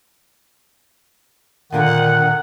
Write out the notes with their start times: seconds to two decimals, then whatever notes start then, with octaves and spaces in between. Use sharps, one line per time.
1.72 A#2 D3 D#3 A#4 F#5